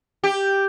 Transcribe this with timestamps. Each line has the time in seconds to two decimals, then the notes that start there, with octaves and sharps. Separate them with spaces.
0.24 G4